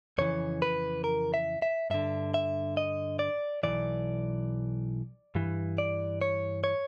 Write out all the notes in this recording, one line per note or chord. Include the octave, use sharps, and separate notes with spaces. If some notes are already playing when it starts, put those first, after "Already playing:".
F2 C#3 E3 C#5
B4
A#4
E5
E5
G2 D3 E5
E5
D#5
D5
B1 A2 E3 D5
G2 E3
D5
C#5
C#5